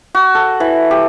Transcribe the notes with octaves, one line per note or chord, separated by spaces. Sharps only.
F#4
A4
E3
G4